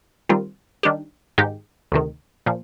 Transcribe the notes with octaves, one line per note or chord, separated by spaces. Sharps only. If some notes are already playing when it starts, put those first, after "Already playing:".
D#3 G3 C4 F4
D#3 G3 D4 G4
G#2 D#3 G#3 D#4 G4
D2 C3 D#3
A#2 F3